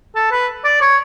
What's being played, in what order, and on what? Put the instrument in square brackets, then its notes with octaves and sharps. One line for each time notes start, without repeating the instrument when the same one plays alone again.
[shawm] A4
B4
D5
C#5